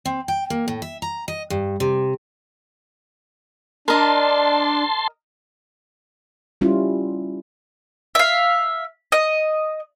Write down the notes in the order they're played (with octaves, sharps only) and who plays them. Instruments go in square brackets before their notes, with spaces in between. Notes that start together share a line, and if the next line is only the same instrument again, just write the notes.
[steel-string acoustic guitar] C4
G5
A#3
A2
E5
A#5
D#5
G2
C3
[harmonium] D4 [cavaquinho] A#4 D#5 [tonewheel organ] A5 C6
[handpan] G3 C#4 E4 F4
[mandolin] E5 F5
D#5